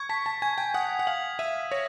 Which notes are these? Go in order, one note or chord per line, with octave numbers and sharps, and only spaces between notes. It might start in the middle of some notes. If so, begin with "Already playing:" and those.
Already playing: C#6 G#6
A5 B6
A5
G#5 G#6
G5
F#5 D#6
F#5
F5 F#7
E5 D#7
C#5 A#6